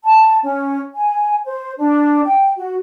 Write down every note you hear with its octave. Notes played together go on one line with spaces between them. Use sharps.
A5
C#4
G#5
C5
D4
G5
F#4